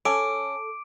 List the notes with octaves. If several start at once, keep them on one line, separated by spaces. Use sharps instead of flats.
C#4 A4 D6 D7